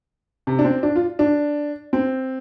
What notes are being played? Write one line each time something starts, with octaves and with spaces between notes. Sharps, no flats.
C3
D4
C4
D4
F4
D4
C4